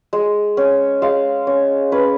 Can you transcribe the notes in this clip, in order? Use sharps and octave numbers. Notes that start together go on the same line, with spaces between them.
G#3
C#4
G#3 F5
C#4
C#4 B4